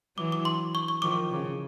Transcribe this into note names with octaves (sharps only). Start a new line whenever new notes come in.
E3 F#3 D6
D6
C6
C#6
C#6
D#3 F3 D6
C#3